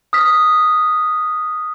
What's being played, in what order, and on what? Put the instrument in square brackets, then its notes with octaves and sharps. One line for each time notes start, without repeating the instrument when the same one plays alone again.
[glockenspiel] D#6 F6 B6